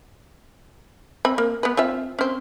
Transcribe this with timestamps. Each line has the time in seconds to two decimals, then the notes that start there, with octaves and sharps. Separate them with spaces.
1.25 C4 B5
1.38 A#3
1.63 B3 B4
1.77 C4 F4 E5
2.19 C4 C#4